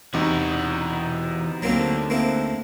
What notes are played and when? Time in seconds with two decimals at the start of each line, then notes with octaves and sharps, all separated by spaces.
0.14 E2 C3 E3 B3 D#4 F#4
1.62 D2 D3 F#3 A#3 C4
2.10 A#3 C4 E4